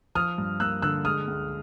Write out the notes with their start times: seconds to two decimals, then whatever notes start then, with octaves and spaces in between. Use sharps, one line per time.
0.15 F3 D#6 F6
0.38 G2
0.60 A#3 E6 F#6
0.82 D3 E6 F#6
1.05 G#3 D#6 F6
1.28 C#2